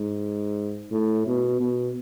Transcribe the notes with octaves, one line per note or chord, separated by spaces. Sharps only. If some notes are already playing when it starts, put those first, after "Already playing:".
Already playing: G#2
A2
B2
B2